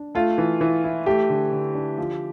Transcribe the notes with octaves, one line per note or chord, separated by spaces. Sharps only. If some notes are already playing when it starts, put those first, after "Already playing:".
Already playing: D4
A3 F4
E3
E3
E4
A3 G4
D3
D3
D4
F3